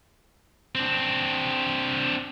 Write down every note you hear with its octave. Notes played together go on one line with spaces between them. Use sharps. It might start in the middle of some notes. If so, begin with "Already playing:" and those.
C4 D4